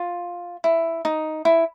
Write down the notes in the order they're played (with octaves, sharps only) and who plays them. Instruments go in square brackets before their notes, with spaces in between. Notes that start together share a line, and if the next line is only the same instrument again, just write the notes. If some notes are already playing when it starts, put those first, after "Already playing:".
Already playing: [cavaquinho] F4
E4
D#4
E4